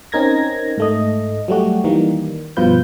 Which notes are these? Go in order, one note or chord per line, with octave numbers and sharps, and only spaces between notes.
C4 C#4 D#4 A#4 G#6 A#6
G#2 A3 D#5
F#3 G3 A3 F#4 G4
D#3 E3 G3 A#3
G2 B2 F3 F4 B4 G6